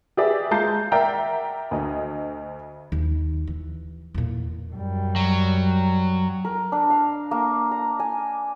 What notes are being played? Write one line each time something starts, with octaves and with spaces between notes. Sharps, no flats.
G4 G#4 B4 D5 E5
G#3 F4 A5 A#5 G6 C7
A#4 D5 E5 F#5 G5 A#5
D2 D#5
D#2
E3
E2 A#2
F#2 G3
F#3
A#4
D4
F5
A#3
A#5
G#5